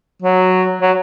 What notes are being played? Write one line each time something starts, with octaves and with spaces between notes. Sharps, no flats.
F#3
F#3